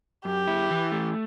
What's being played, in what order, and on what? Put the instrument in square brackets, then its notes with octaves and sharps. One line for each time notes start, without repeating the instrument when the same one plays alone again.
[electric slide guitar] F#2 [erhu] G4
[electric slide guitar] E4
E3
A3